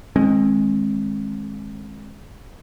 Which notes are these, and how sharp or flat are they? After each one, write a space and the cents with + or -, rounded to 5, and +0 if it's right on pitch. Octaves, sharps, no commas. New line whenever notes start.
D#3 +0 G#3 +0 C4 +35